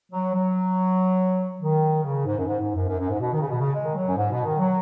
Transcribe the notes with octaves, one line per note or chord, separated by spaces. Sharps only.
F#3
F#3
D#3
C#3
G#2
F#2
G#2
G#2
F#2
F#2
F#2
G#2
B2
D#3
C#3
B2
C#3
G#3
D#3
F#3
F#2
G#2
B2
D#3
F#3